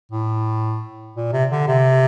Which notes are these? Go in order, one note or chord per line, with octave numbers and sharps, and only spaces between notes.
A2
A#2
C3
D3
C3